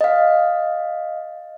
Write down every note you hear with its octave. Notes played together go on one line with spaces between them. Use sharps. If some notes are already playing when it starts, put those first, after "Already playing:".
D#5 F5